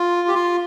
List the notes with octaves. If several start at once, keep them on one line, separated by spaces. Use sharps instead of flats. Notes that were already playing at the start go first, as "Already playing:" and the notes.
Already playing: F4
G4
F4